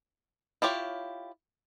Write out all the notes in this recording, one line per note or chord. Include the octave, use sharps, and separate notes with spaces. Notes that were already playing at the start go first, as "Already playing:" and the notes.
E4 F4 G4 C#5